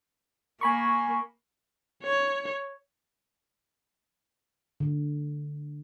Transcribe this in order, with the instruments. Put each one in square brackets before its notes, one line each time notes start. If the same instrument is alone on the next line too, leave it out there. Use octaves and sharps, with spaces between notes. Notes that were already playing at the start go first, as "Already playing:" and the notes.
[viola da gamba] A#3 [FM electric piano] G#5 B5 C#6
[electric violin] C#5
[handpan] D3